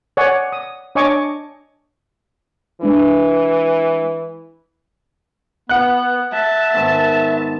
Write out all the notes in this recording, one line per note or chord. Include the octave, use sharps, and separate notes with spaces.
C#5 D5 F#5 G#5
D#6
D4 C#5 D#5 G#5 C#6 D6
E3 G#3 D4 B4
B3 F#5 F#6
E5 A5
G#2 D#3 B3